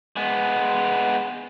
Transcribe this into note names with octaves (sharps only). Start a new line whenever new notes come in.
G#3 B3